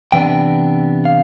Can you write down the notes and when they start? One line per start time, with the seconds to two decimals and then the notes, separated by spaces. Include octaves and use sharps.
0.12 C3 E3 B3 D4 G5
1.05 F5